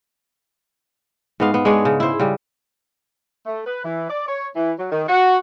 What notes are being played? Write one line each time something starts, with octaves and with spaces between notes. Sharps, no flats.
G#2 B3 F5
B3
G#3 D4 G#4 C#5
C#3
E4 C5
C#3 G3
A3
B4
E3
D5
C#5
E3
F#3
D#3
F#4